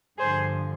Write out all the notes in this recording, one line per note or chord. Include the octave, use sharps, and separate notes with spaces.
G2 D3 F3 G#4 C5